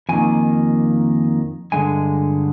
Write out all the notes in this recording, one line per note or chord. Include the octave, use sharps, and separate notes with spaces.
F2 D#3 A#3 G#5
G2 D3 G#3 G#5